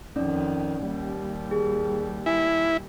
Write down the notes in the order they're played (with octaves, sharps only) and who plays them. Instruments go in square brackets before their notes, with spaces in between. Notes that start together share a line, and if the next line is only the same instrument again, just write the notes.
[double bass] F2 D#3 [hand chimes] C#4 D#4 D5
[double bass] D#2 G3
[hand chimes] G#4
[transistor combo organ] E4 [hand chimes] G#5